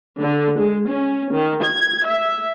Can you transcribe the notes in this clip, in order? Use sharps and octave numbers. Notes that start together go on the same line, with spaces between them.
D3
G#3
C#4
D#3
G#6
E5